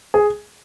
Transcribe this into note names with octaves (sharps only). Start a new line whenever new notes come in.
G#4